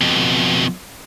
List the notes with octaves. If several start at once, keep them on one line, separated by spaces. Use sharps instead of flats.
F2 B2